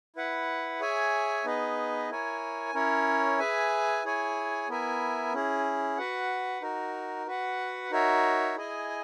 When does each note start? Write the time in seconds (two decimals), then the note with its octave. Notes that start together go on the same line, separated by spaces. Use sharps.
0.16 E4 B4 F#5
0.80 G#4 C#5 E5 G#5
1.45 B3 D#4 G#4 B4 D#5
2.10 E4 A#4 C#5 G#5
2.74 C#4 E4 A#4 C#5
3.39 G#4 B4 E5 G#5
4.04 E4 G#4 C#5 G#5
4.69 B3 E4 A#4 E5 G#5
5.33 C#4 E4 G#4
5.97 F#4 B4 F#5
6.62 D#4 F#4 A#4
7.27 F#4 B4 F#5
7.91 D#4 F#4 A#4 C#5 E5
8.55 E4 G#4 D#5 G#5